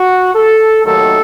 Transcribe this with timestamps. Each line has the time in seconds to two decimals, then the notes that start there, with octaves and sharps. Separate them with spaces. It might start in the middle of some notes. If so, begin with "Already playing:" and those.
Already playing: F#4
0.35 A4
0.84 D#2 D#3 F#3 A3 A4